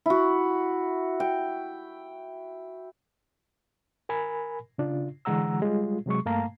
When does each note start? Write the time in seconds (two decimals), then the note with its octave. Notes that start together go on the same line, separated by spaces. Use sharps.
0.06 E4 F#4
1.20 G5
4.09 A#4 G#5 B5
4.78 C#3 D4 F4
5.25 D3 E3 G#3 F#5 A#5 E6
5.60 G3 G#3 F4
6.06 C3 F#3 G#3 C#6
6.25 G2 A3 A#3 F5 A5 A#5